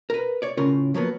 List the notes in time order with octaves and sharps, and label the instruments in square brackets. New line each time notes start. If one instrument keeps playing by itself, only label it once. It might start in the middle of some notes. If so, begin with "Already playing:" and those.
[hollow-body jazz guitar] A#4 B4
C#5 D5
A2 C#3 C#4 F4 A#4
F3 F#3 A#3 B3